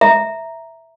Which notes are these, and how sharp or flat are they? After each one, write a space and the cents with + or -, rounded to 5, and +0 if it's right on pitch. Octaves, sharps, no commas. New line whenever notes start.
E5 +0 A#5 +0